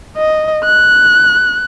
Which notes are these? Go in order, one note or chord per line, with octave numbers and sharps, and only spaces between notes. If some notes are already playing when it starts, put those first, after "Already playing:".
D#5
F#6